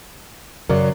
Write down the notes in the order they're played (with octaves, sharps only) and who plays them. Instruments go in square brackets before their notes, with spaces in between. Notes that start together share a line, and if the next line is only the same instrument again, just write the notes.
[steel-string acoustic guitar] F#2 C#3 F#3 [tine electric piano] A#4 D5